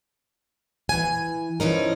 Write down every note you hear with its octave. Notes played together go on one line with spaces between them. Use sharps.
E3 G#5
E3 F3 C#4 D#4 A#4